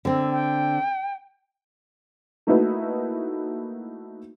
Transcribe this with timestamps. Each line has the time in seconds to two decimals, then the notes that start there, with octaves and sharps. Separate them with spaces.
0.05 D3 C4
0.33 G5
2.47 A3 A#3 D#4 E4 F#4 B4